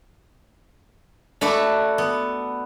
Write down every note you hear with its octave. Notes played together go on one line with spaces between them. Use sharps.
A3 D4 F#4 A4 B4
B3